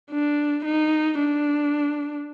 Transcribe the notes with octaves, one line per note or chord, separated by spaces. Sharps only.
D4
D#4
D4